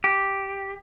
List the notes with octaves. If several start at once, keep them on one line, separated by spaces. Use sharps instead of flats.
G4